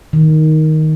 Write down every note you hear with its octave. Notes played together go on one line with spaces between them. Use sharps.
D#3